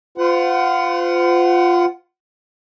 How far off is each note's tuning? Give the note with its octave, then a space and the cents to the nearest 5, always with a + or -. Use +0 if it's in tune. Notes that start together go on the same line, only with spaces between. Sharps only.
F4 +0 C5 -40 F#5 +15